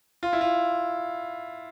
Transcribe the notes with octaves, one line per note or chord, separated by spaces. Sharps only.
F4
E4
F4